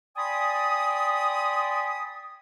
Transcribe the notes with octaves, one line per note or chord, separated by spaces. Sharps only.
D5 G5 G#5 B5 C6 D#6